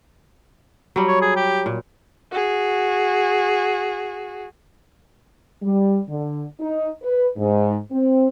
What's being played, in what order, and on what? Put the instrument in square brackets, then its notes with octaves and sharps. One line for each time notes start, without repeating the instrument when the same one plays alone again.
[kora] F#3 G3
[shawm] C#5
G#4
G4
[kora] A#2
[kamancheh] F#4 G#4
[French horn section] G3
D3
D#4
B4
G#2
C4